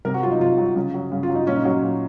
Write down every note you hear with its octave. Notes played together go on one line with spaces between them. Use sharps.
C3 A#4
F#4
F#3 F4
D#4
C3 F4
F#3
C#3
F#3
C#3
F4
F#3
D#4
A#2 C#4
D#4
F#3 C#4
A#2